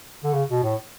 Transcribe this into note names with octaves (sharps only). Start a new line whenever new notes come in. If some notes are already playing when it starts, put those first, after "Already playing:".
D3
C#3
B2
A2